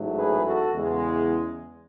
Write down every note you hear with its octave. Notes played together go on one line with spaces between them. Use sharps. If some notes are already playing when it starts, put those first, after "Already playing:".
Already playing: A1 G#2 F#3 A3
G#4 B4
F#4 A4
E2 C#3 G#3